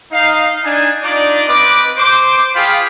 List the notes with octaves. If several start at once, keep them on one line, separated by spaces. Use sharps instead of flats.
D#4 F5
D4 D#4 G#5
D4 D#4 F4 D5
C4 B4 D#5 D6
C5 D6
F4 G#4 C5 F5 G5 B5